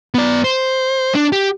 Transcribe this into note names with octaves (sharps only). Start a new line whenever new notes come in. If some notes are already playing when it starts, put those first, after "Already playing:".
B3 D5
C5
D4
G4